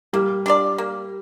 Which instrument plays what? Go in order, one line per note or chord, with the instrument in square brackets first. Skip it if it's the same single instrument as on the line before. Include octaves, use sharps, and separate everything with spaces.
[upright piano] G3 [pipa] A#3
[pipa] D4 F4 D5
A#3